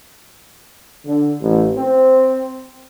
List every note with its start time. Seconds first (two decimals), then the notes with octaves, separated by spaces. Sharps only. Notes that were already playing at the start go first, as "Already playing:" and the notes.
1.06 D3
1.41 A1
1.75 C4